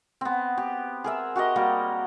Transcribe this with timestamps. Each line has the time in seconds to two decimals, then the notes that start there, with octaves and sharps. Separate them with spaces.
0.21 B3 C4
0.58 G4
1.04 G#4 A#4 E5
1.36 F#4 G4 A#4 D#5
1.56 G3 A#3 F#4